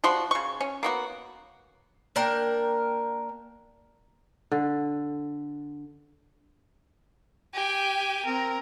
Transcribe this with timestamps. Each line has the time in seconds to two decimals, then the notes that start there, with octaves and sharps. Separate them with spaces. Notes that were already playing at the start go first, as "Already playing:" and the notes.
0.04 F3 G3 F#4 C6
0.31 C#3 C#6
0.61 C#4
0.83 A#3 B3 F#4
2.16 A#3 D4 A#4 G5
4.52 D3
7.54 G4 G5 G#5
8.26 C4 A#4